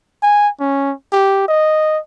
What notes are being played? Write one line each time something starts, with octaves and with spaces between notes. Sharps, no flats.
G#5
C#4
G4
D#5